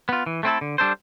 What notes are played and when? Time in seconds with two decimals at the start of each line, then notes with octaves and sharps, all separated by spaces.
0.09 B3 F4
0.26 E3
0.43 A3 C4 E4 A4
0.61 D3
0.78 G3 D4 A4 C5